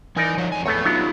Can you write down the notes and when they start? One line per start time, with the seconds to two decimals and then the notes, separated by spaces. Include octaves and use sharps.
0.16 E3 D#4 A#4 D5 G#5
0.37 F3 C#5
0.52 F2 G#5
0.66 E2 A3 B3 A4 C#5
0.85 F#3 B3 D4 D#4 F4